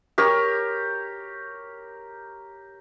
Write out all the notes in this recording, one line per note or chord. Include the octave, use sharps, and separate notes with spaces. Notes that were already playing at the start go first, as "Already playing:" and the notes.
G4 A#4 C#5